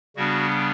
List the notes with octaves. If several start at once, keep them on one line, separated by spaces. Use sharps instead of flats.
C#3 G3 B3 D4 F#4